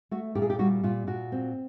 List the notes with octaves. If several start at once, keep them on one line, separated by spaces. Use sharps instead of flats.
A3 F#4
A#2 G4
G#4
G4
G3 F#4
A#2 F4
A#2 F#4
C4